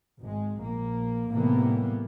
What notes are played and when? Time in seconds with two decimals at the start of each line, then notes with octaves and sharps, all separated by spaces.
0.20 G#1 G#3
0.60 A#1 A#3
1.31 A2 C3 E3 G3 A#3 B3